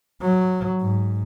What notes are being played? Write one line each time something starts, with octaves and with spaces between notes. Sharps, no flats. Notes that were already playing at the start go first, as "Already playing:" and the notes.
F#3
G#2